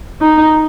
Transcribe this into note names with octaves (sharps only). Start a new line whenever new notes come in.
D#4